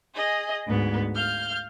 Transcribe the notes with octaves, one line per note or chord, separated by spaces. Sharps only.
G#4 D#5
D2 G#2 B3
F5 F6 G6